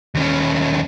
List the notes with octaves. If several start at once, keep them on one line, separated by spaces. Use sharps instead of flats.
D#2 C#4